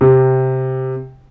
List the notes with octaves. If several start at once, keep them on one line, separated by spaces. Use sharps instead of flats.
C3